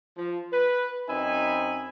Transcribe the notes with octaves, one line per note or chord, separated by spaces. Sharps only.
F3
B4
F#2 C4 D#4 E5 G#5 B5